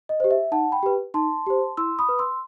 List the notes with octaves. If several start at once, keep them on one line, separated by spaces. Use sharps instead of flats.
D#5
G4 C5
E5
D#4 F#5 A5
G5 B5
G4 B4
D#4 A5 C6
G4 C5
E4 C6 E6
B5 D#6
B4
C6 E6